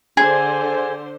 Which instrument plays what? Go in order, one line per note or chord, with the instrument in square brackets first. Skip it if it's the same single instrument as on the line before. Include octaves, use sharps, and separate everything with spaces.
[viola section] D3 C5 [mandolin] G#4